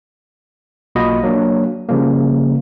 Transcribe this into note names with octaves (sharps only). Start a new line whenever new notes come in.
B1 A#3 F4 F#4 D#5 B5
F#3 A#3 D4
C#3 F3 G3 A#3